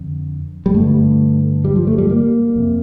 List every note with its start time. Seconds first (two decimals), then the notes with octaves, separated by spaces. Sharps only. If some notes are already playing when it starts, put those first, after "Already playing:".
Already playing: F2 D3
0.66 G3
0.74 G2 D3 A3
1.65 G3
1.76 F3
1.87 A3
1.98 G3
2.10 A#3
2.55 F2 C3